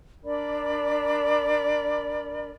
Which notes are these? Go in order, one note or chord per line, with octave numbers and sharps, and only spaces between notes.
D4 A#4 D5 B5